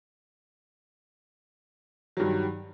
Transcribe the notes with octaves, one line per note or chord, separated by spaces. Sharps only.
G2 D#3 F#3